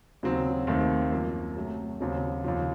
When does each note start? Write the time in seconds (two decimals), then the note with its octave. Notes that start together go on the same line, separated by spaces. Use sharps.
0.23 D#2 C#3 F#3 C4
0.67 D#2 D#3 A3 C4
1.12 F#2 F3 A#3
1.56 C3 F#3 A3
2.01 D#2 C#3 F#3 C4
2.44 D#2 C#3 F3